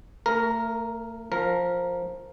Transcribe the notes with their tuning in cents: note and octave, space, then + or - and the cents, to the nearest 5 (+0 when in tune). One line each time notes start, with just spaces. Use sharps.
A3 +40 A#4 +0
F3 +10 A#4 +0